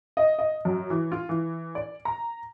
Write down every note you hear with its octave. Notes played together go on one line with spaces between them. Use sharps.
D#5
D#5
F#2
E3
F4
E3
D5
A#5